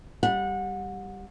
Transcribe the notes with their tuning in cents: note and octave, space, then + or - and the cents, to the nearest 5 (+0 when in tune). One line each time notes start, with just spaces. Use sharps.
G3 +0 F#5 -25